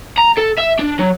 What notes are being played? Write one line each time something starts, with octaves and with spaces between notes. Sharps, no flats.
A#5
A4
E5
D4
F#3